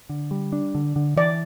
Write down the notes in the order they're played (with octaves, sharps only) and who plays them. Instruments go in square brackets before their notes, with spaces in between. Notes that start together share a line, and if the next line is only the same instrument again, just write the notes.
[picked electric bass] D3
G3
D4
D3
D3
[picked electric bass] E3 [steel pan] D5